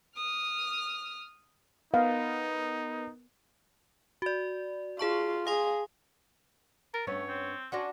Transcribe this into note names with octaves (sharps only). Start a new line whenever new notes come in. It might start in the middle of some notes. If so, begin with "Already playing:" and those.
D#6 F6
B3 D#4 A#4 F5
F#4 D5
F4 G#4 A5 C#6
G#4 F5 C6
A#4 A6
G2 A3 B3 C#4 C#5
C4
C#4 D4 F#4 D5 F#5 C6 A#6